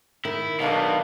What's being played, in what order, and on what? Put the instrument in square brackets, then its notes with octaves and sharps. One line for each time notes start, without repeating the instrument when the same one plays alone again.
[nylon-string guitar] D#3 [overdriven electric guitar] E4
[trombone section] B1 D4 D#4 [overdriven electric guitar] B2 [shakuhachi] F5